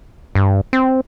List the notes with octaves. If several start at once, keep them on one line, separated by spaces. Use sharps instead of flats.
G2
C4